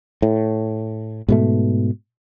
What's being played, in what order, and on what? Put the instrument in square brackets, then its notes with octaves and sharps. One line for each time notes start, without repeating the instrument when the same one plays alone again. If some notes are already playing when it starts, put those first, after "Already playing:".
[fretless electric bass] A2
G#2 B2 A3